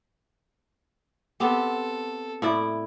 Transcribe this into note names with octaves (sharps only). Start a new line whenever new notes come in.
B3 C4 G4 A4
A2 E4 D5